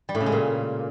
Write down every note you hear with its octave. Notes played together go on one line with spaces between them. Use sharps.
G3
A2
C#3
G#3
A#2